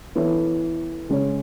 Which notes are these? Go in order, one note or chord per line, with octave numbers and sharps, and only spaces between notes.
E3 B3 E4 A4 C#5
C#3 G#3 C#4 G#4 C#5